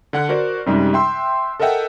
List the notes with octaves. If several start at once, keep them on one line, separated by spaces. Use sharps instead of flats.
D3 F#5 F#6
F#4 A#4 C5 D5
F#2 C3 G3 G#3 D#4
E5 G5 C6 E6
A4 A#4 D#5 E5 F#5 G5